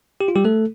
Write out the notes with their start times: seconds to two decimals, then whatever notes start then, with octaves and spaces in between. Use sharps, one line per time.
0.21 G4
0.28 F4
0.36 G3 G4
0.45 A3 A4